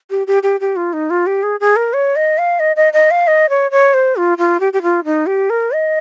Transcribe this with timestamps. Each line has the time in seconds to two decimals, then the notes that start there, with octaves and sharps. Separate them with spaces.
0.10 G4
0.27 G4
0.43 G4
0.60 G4
0.76 F4
0.93 D#4
1.10 F4
1.26 G4
1.43 G#4
1.60 G#4
1.76 A#4
1.93 C#5
2.16 D#5
2.38 F5
2.59 D#5
2.76 D#5
2.93 D#5
3.11 F5
3.27 D#5
3.49 C#5
3.71 C#5
3.94 C5
4.16 F4
4.38 F4
4.60 G4
4.73 G4
4.82 F4
5.05 D#4
5.26 G4
5.50 A#4
5.72 D#5